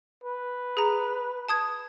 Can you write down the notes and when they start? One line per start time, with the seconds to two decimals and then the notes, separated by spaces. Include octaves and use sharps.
0.24 B4
0.77 G#4 A#5
1.49 A5 D#6 G#6